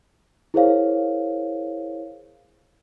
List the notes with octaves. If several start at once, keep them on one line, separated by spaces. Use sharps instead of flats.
E4 G#4 A#4 C5 C#5 F5